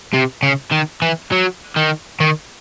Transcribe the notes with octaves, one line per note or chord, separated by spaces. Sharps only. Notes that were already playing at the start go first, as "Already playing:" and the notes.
C3
C#3
D#3
E3
F#3
D#3
D#3